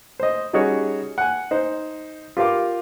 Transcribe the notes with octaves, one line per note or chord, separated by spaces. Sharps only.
C5 D#5
G3 C#4 D#4 F#4 G#4 C#5
F#5 G#5
D#4 C5
F4 G4 A#4 F5 D6